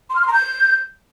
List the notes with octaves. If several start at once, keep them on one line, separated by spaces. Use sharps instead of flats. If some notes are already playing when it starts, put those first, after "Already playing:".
C6
F6
C6
A#5
G6